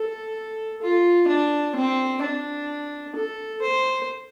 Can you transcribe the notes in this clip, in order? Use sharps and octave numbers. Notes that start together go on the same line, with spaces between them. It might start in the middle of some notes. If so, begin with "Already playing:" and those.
Already playing: A4
F4
D4
C4
D4
A4
C5